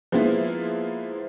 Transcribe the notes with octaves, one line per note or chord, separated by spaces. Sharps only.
F3 G#3 A#3 B3 E4 F4